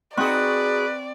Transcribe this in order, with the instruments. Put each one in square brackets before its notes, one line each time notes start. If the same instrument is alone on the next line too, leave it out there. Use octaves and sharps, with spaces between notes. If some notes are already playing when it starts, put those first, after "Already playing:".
[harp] C4 C#6 F#6 [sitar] D#4 F#4 G#4 [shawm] B4 [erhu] D5